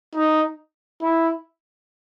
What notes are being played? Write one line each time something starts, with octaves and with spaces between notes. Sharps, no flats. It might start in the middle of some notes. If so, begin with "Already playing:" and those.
D#4
E4